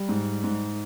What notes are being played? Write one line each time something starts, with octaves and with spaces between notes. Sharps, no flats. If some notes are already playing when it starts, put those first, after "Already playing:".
Already playing: G3
G#2
G#2